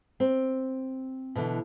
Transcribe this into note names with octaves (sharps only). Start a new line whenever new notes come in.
C4
B2 D3 E3